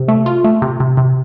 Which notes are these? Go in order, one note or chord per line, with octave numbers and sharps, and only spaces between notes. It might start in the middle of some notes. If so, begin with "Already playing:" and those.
Already playing: C3
A3
F4
A3
C3
C3
C3